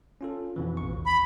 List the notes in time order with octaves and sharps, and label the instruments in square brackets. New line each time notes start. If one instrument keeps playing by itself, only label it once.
[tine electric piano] C#4 F4 A4
F2 B2 E3
A1 C#6
D#2
[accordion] B5